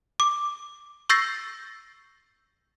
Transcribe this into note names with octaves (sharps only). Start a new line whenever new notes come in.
D6
C#6 E6 G6 A6 A#6 C7